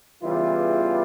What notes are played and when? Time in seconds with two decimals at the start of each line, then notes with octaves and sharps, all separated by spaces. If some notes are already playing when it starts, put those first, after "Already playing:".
0.22 E2 C#3 E3 G3 F4